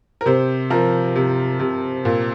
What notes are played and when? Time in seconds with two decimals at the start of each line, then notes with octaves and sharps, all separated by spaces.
0.21 A#4
0.26 C3 C5
0.70 F3 A#4
1.15 C3
1.60 C3
2.05 A#2